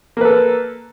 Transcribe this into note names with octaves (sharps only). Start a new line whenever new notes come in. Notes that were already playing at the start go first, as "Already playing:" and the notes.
A#3 A4 B4